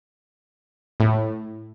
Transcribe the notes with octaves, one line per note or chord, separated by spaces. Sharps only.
A2